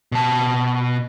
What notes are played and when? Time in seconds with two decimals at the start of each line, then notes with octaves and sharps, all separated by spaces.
0.12 B2 A5